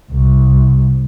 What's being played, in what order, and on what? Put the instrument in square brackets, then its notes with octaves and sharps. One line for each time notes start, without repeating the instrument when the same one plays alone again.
[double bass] C2